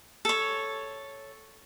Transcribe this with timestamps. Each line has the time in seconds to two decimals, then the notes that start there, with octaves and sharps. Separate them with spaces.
0.25 A4 C#5